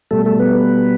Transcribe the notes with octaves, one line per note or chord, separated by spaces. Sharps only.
B2 G3 A3 A4
A3 A4
B3 B4